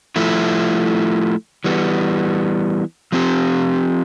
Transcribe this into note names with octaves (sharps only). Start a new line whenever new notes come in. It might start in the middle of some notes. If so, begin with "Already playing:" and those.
F3 A3 E4
E3 G3 B3
F3 C4 G4